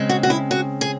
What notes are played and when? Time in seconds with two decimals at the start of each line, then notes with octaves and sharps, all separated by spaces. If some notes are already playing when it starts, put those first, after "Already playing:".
Already playing: C#3 G#3 C4
0.09 F#4
0.23 F#4
0.30 E4
0.51 F#4
0.81 G#4